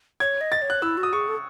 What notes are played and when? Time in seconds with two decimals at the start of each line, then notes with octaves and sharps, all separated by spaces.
0.20 C#5 G#6
0.41 D#5
0.52 A6
0.62 C#5
0.70 F#6
0.82 E4 E6
0.97 F#4
1.03 D#6
1.13 G#4 C#6
1.28 A4